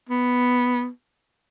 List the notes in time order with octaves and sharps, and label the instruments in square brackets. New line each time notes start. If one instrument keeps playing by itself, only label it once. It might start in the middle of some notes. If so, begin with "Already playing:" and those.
[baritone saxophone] B3